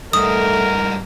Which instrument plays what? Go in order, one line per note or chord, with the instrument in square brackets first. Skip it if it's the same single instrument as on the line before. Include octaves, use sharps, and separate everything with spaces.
[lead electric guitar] G2 D#4 [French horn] A3 [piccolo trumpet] A#4 [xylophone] D#6